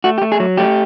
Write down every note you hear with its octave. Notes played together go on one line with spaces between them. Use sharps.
A3 F#4
G4
A3
G#4
F#3
A3 G4